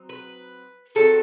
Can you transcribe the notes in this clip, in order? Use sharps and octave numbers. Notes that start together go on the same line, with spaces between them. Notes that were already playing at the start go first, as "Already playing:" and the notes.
Already playing: F#3 C4 D#4
B4
D#3 F#3 C4 D#4 A4